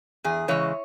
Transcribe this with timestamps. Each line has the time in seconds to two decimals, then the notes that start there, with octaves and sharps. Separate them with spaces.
0.24 E2 G#4
0.48 C#3 E3 G#3 C#5